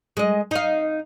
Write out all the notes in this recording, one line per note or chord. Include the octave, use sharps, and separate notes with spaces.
G#3 D#5
D#4 F5